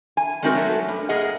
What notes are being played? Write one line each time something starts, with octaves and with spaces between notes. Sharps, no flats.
G#5
G#3 A3 C4 D#4 F#4 A#4
F#3 A3
G2
A#2 G#4 A#4 D#5 F#5